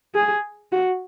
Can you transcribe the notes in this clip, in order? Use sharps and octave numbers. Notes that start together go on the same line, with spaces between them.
G#4
F#4